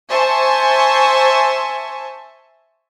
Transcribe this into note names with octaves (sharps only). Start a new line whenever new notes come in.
C5 E5 G#5 A5 C#6